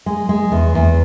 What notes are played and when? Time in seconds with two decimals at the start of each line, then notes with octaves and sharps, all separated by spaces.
0.06 G#3
0.29 G#3
0.52 E2
0.75 E2